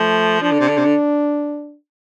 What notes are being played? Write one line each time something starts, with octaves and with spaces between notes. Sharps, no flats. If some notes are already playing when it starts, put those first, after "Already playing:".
Already playing: F3 A3
F3 D4
D3
C3
D3
C3
D3